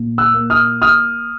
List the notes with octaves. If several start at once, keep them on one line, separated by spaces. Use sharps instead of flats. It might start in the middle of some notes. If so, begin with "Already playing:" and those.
Already playing: A#2
E6 F#6
A#3
D#6 F6
D#6 F6